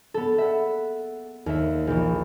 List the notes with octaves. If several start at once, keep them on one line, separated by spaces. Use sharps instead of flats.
B3 A4
E5 F#5
D#2 E5
A#1 E3